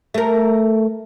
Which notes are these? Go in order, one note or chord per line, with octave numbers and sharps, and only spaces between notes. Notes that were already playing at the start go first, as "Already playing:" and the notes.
A3 A#4